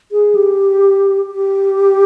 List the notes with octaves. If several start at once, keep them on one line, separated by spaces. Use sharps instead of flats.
G#4
G4
G4